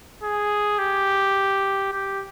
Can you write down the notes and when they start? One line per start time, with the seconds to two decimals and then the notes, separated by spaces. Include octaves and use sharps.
0.23 G#4
0.79 G4
1.92 G4